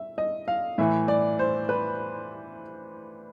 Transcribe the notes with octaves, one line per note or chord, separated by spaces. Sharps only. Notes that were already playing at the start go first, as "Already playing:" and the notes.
Already playing: E5
D#5
F5
A2 E3 E5
D5
C5
B4